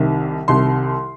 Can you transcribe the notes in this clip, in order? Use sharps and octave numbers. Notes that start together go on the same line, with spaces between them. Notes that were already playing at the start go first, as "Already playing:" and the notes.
Already playing: C2 C3 D#3
C2 C3 D#3 C6